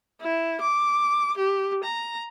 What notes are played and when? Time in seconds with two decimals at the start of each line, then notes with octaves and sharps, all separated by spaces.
0.21 E4
0.61 D6
1.37 G4
1.84 A#5